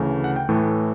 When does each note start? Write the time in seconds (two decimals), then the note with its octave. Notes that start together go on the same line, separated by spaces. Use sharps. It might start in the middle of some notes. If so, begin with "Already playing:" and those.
Already playing: D2 C#3 E3 A3
0.24 F#5
0.36 G5
0.49 A2 E3 A3